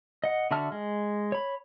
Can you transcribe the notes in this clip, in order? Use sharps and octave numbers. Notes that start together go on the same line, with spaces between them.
D#5 F#5
D3 F#4 E5 A5 F6
G#3
C#5 B5